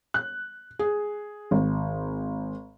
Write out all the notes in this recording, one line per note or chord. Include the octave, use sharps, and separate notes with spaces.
F#6
G#4
G#1